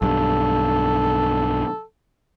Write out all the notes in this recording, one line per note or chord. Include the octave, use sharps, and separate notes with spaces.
B1 G2 A4